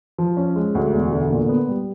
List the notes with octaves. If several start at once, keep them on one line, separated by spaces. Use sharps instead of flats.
F3
C#4
G#3
D2
E1
D3
A#2
B3
G3